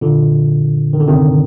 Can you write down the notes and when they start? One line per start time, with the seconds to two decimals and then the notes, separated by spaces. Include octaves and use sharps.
0.01 A#2 D3
0.93 D#3
1.00 D3
1.08 C3 D#3